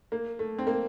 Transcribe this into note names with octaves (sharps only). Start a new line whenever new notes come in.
A#3
A3
C4
A#3